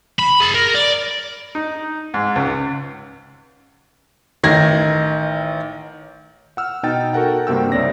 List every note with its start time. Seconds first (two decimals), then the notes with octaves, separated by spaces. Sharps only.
0.19 B5
0.40 G#4 A5
0.54 A#4
0.75 D5
1.55 D#4
2.14 G#2
2.36 C#2
4.43 A1 D#3 G#6 A#6
6.57 F#5 E6 F6
6.83 B2 D#4 G5 A6
7.13 F#4 A4 A#4 F#5 G5
7.47 G2 C3 A#3 G5 E6
7.72 C2 C3 C#5 D5 A#6